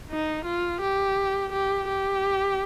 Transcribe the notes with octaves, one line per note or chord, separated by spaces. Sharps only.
D#4
F4
G4
G4
G4